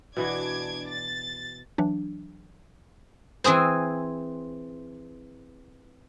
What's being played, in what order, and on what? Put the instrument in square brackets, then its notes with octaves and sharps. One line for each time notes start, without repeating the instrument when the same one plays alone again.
[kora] B2 E3 F#4 [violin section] D4 D6 G#6
[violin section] A6
[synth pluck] E3 F#3 D4
[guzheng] E3 C4 G#4 C5